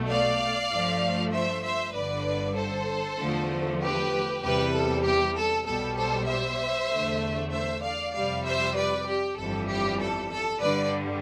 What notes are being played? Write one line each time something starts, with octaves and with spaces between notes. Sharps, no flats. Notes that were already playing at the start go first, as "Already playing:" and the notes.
Already playing: B1 B2 A3
D5 F5
G2 F3 A3
C5 E5
C5 E5
G1 G2 D3 B4 D5
A4 C5
E2 D3 F3 A3
G4 B4
E2 C3 G3 G4 B4
A4
G4
A4
B1 B2 G3 A4
A4 C5
C5 E5
E2 D3 A3
C5 E5
D5 F5
F2 C3 G3 D5 F5
C5 E5
B4 D5
G4
G1 F2 E3 G3 A4
G4
A4
A4
G2 D3 G3 B4 D5